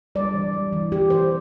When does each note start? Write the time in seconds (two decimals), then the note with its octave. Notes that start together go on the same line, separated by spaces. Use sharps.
0.15 G3 D5
0.34 E3
0.53 G3
0.73 E3
0.92 E3 G4
1.10 E3 C5